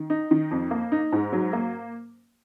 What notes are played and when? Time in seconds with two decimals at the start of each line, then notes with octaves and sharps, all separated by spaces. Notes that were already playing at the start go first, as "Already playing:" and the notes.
Already playing: D#3
0.10 D#4
0.31 D#3
0.51 F2
0.71 A#3
0.92 D#4
1.12 G#2
1.32 F#3
1.53 A#3